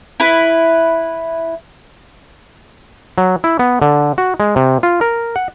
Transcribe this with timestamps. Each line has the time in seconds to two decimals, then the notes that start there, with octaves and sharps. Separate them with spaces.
0.20 E4 B4
3.18 F#3
3.44 E4
3.59 B3
3.82 D3
4.18 F#4
4.40 G#3
4.56 C3
4.83 F4
5.01 A#4
5.36 F#5